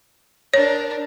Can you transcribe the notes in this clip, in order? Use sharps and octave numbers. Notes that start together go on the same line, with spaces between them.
D4 A#4 C#5